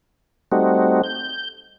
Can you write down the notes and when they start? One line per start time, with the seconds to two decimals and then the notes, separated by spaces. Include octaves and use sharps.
0.52 G3 A3 C4 D#4 F#4
1.04 G6